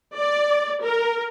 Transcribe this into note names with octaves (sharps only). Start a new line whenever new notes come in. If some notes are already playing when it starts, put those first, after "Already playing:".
D5
A#4